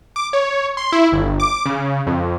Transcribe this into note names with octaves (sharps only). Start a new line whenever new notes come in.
D6
C#5
C6
E4
G1
D6
C#3
F2